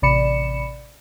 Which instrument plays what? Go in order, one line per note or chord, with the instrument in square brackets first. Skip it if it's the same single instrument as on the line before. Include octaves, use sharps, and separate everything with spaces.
[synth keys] A1 C3 D5 B5 C#7 E7